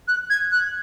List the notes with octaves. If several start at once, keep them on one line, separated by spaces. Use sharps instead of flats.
F#6
G#6
F#6